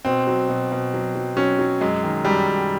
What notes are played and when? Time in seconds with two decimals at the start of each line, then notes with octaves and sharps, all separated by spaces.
0.05 B2 C4
0.27 F#3
0.49 B2
0.72 B2
0.94 F#3
1.16 F#3
1.37 F#3 C#4
1.59 F#3
1.81 F#2 G#3
2.03 D#3
2.25 F#2 G3
2.48 F#2